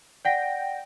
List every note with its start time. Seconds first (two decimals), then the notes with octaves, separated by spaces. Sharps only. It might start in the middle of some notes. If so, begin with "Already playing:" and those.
0.25 D5 F#5 G5 A#6